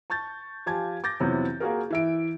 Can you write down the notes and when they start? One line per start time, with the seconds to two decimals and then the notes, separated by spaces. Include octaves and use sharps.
0.10 A5 C#6 G6 A6
0.66 F3 F4 G4 G#5 A5 G#6
1.04 D6 G6 A6 A#6
1.20 F2 C3 E3 F#3 B3
1.60 A#3 F4 F#4 G#4 A#4
1.91 E3 E5 D7